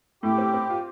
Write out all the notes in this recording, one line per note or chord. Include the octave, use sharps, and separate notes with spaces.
A2 G4
C4
C4
F4